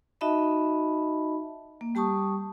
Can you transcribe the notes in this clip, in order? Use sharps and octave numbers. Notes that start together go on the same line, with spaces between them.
D#4 F#4 D#5 E5 A5 B5
A#3
G3 G4 A5 C#6 D#6